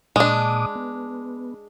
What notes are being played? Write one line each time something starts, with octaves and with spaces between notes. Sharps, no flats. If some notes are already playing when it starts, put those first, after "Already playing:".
A#2 G#3 D4 D6 D#6
B3